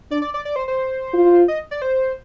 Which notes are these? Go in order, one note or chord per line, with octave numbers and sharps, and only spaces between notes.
D4 D5
D5
D5
D5
C5
C5
F4
D#5
D5
C5